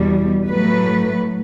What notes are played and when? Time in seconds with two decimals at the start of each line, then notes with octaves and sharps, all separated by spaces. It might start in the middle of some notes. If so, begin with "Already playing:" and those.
Already playing: E2 B2 G3
0.46 A2 F#3 A3 B4